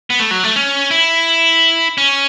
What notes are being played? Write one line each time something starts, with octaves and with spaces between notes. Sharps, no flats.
B3
A3
F#3
A3
C#4
E4
C#4